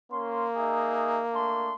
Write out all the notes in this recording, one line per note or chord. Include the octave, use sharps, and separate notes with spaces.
A#3 C#4 C6
D#4 G#4 E5
A3 D4 C6